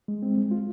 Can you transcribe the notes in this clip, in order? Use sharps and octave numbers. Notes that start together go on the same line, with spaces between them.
G#3
C4
G#3
F4